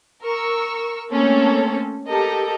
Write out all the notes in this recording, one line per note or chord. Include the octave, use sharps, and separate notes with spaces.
A#4 C#6 E6
A3 A#3 C4 C#4 A4
G4 A4 A#4 D#5